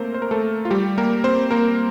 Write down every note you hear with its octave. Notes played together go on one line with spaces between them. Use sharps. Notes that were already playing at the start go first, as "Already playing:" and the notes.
Already playing: A3 A#3 C4 A#4 C5
C5
A#4
A3 A4
F4
G3 G4
A#3 A#4
C4 C5
A#3 A#4